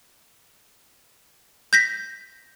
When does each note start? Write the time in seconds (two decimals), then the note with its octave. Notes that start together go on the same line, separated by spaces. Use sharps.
1.73 G6 A#6 B6